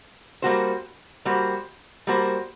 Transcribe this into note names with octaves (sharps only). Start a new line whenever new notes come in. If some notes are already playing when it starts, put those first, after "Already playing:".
G3 A#3 F#4 C5
G3 A#3 F#4 C5
G3 A#3 F#4 C5